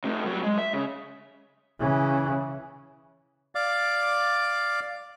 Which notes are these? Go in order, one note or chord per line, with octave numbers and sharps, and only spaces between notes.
C3 A3
F#3 G3
G#3
E5
C#3
C#3 E3
D5 F5 D6